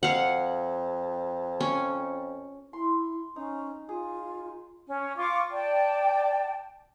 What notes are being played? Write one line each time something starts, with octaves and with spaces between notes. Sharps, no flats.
F2 F5 F#5
C#4
E4 C6
C#4 D#4
F4 G#4
C#4
F4 C#6 D6
D5 G5 A5